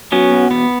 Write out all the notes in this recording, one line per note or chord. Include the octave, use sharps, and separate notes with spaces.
F#3 B3 C#4
B2
E2 B3